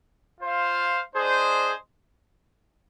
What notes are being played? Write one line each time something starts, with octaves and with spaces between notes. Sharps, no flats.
F4 C5 F5
D4 G#4 C5 D#5